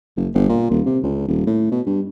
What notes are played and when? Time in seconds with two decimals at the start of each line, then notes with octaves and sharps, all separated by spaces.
0.17 F#1
0.35 G1
0.49 A#2
0.71 D#1
0.86 C3
1.04 C#2
1.28 D#1
1.47 A2
1.72 B2
1.87 G2